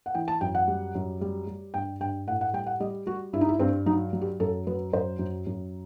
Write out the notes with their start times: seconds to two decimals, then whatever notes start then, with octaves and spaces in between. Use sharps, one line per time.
0.06 F#5
0.15 E3 G5
0.28 A5
0.41 F#2 G5
0.55 F#5
0.68 G3
0.95 F#2
1.21 G3
1.47 G3
1.74 G2 G5
2.00 G2 G5
2.27 A2 F#5
2.41 F#5
2.53 G3 G5
2.66 F#5
2.80 G3 D#5
3.06 G3 F#4
3.33 G2 E4
3.41 D#4
3.49 E4
3.60 G2 C4
3.86 F#3 D#4
4.13 F#3
4.21 G4
4.40 F#2 A4
4.67 F#3 B4
4.93 F#2 C5
5.19 F#2
5.47 F#2